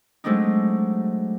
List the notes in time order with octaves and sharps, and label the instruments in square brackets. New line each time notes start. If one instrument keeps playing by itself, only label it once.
[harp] F#3 G#3 A3 C4 D4 D#4